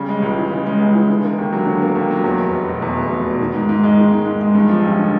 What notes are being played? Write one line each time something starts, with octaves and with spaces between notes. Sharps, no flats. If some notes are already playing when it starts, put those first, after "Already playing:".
Already playing: C#3 G3
G#3
C#2
E3
C#3
G#3
C#2
E3
D3
A#3
D#2
F#3
D3
A#3
D#2
F#3
E2
F1
F1
B2
E2
F1
F1
B2
D#3
G#2
G#2
G#3
D#3
G#2
G#2
G#3
G2
F3
A1
D3